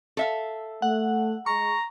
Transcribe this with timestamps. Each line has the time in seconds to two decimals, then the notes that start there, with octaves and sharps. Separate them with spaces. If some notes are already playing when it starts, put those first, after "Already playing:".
0.17 A4 E5 F5
0.82 A3 F#5
1.46 G#3 A#5 C#6